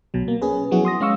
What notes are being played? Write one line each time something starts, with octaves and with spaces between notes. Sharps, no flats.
B1 B2 F#3
A#3
C#4 G#4 B4
F3 F#3 B3 E4 F#4 G#4
C6 D#6 A#6
G#3 C#4 F5 C#6 E6